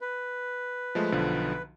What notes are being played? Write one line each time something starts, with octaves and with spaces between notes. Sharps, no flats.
B4
F3 G#3 A3
B1 D3 F3